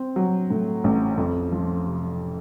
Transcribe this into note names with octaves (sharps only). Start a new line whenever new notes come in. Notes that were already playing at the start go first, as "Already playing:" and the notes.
Already playing: C4
F#3
A2
A1
F2
F3
C3